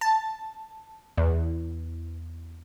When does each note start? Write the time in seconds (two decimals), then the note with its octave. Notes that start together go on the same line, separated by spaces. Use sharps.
0.01 A5
1.17 E2